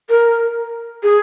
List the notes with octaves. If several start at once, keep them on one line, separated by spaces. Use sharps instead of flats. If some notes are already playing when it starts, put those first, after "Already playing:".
A#4
G#4